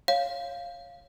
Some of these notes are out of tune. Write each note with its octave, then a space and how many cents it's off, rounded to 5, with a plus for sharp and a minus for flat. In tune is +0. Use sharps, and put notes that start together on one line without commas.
C#5 +0 F5 -5